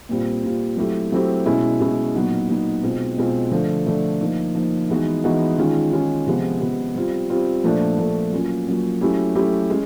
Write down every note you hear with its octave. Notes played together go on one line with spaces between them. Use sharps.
A#2 G3 C4 F4
A#2 G3 C4 F4
F#3 A3 C4 E4 G4
F#3 A3 C4 E4 G4
B2 G#3 C#4 E4
B2 G#3 C#4 E4
A#2 F#3 B3 D#4
A#2 F#3 B3 D#4
B2 G#3 C4 F4
B2 G#3 C4 F4
D3 F3 A3
D3 F3 A3
F3 A#3 D#4
F3 A#3 D#4
E3 G#3 B3 D#4 F#4
E3 G#3 B3 D#4 F#4
D#3 G#3 C#4 F4
D#3 G#3 C#4 F4
C3 F3 G#3 B3
C3 F3 G#3 B3
G3 C4 F4
G3 C4 F4
A#2 F3 A3 D4
A#2 F3 A3 D4
F#3 A#3 C#4 F4
F#3 A#3 C#4 F4
F#3 A3 C#4 E4 G4
F#3 A3 C#4 E4 G4
G#3 C#4